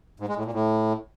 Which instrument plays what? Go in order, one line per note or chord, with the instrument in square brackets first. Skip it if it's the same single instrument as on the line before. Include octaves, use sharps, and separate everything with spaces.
[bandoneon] G#2
G#3
A2
A#2
A2